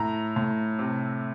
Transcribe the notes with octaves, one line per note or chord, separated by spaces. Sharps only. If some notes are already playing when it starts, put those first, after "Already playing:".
Already playing: A2 A#5
A2
C3